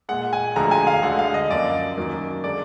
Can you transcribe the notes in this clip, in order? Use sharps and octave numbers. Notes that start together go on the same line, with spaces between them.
A#2 G#3 F#5
G#5
D2 D3 F3 G#3 A#5
G#5
F5
D2 D3 G#3 F#5
F5
D#5
F#2 F3 A#3 D5
F#2 D#3 F#3 A#3
D3 G#3 D5